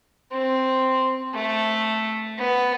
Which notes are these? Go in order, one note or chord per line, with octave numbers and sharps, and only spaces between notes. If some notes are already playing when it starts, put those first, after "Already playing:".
C4
A3
B3